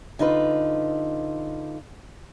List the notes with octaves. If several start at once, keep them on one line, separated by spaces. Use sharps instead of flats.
D3 D#4 F4 B4